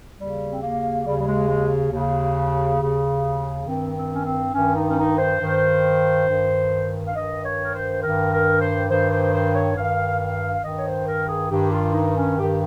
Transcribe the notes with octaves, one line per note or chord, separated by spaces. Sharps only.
D#2 C#3 G3
C4
A#3
D#2 C#3 G3
G3
G#3
G#3
D#2 C#3
D#2 C#3
G2 D#3 C4
C4
C#4
C4
G2 D#3 C#4
D#4
C#4
D#4
C5
G2 D#3
G2 D#3
F5
G2 D#3 D#5
C#5
A#4
C5
G2 D#3 A#4
A#4
C5
G2 D#3 C5
C5
C5
C#5
G2 D#3 F5
F5
G2 D#3 D#5
C#5
C5
A#4
G#4
G2 D#3 G4
F4
D#4
C#4
G2 D#3 G4